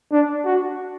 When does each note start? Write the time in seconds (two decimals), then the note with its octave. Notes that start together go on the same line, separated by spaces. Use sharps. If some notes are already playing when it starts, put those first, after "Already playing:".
0.12 D4
0.45 F#4